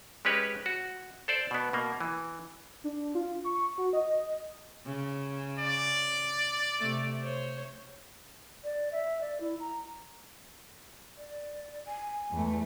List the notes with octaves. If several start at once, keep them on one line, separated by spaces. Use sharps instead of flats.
G#3 C#4 G4 B4 C#5
F#4
A4 C5 D5
B2 B3
B2 A#3
E3
D4
F4
C#6
F#4
D#5
C#3
D5
C3 A3
C5 C#5
D5
E5
D5
E4
A#5
D5
G#5
E2 A3